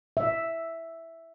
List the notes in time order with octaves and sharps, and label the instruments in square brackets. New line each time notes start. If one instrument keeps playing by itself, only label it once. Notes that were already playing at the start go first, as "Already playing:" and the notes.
[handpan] E5